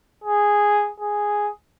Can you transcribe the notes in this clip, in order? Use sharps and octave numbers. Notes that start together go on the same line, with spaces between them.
G#4
G#4